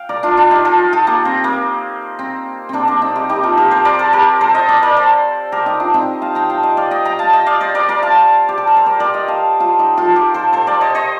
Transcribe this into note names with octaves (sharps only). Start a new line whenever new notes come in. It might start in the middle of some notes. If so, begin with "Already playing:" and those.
Already playing: F5 G5
A#4 D5
D4 F4
D4 F4
D#4 G4
F4 A4
F4 A4
A#3
C4
A#3
C4
A#3 C4 D4
A#3 D4
C4 D#4
D#4 G4
D#4 G4
F4 A4
G4 A#4
A4 C5
A#4 D5
A4 C5
G4 A#4
A4 C5
C5 D#5
A#4 D5
A#4 D5
A4 C5
G4 A#4
D#4 G4
D4 F4
C4 D#4
F5 A5
G5 A#5
F5 A5
D#5 G5
D5 F5
D#5 G5
G5 A#5
F5 A5
D#5 G5
D5 F5
C5 D#5
A#4 D5
A#4 D5
F5 A5
G4
A4
A#4
C5
A#4 D5
A#4 D5
D#5 G5
F5 A5
F4 A4
D#4 G4
F4 A4
G4 A#4
A4 C5
A4 C5
A#4 D5
C5 D#5
C5 D#5